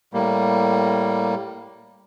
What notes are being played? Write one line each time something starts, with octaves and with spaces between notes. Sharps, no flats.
A2 G3 A#3